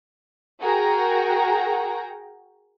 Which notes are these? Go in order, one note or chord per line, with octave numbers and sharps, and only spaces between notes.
F#4 G#4 A#4 G5 A#5